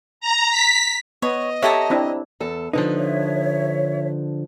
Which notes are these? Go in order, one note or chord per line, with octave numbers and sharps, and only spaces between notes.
A#5
B6
B3 C#5 D#5
G4 A4 C#5 E5 A5 A#5
C4 D4 E4
E2 A4
D3 F3 D#4 B4
C#5 E5